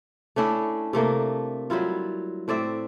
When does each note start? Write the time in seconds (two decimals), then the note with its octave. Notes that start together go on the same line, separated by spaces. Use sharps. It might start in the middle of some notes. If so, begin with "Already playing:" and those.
0.36 A3 C#4 D4 E4
0.93 C3 A3 A#3 D4
1.70 F#3 G3 E4 F4
2.48 A2 C4 D5 E5